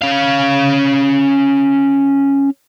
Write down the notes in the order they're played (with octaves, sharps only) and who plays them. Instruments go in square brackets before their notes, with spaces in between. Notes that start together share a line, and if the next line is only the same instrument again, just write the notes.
[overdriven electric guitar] C#4 F5